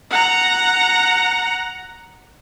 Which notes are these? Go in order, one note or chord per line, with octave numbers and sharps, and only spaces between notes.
F#5 A#5